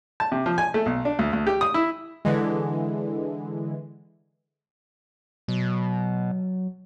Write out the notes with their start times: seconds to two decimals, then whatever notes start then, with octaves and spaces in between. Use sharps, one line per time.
0.20 A5
0.32 C3
0.46 F3
0.58 G#5
0.74 A3
0.86 B1
1.05 D4
1.19 D2
1.33 D2
1.47 G4
1.61 D#6
1.74 E4
2.25 D3 E3 G#3
5.48 B2 F#3